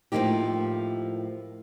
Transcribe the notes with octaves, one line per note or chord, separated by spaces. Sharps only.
A2 F3 A#3 D#4 G4